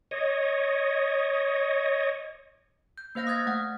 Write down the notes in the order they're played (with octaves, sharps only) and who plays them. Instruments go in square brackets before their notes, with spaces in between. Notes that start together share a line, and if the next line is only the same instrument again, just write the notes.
[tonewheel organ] C#5 D#5
[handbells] G6
A#3 C5 F5 G6 A#6
D#6 F6 F#6 G#6 A6
A3 F#5 F6